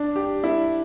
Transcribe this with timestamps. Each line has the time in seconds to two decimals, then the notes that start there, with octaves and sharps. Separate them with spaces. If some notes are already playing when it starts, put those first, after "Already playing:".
Already playing: D4
0.16 G4
0.44 E4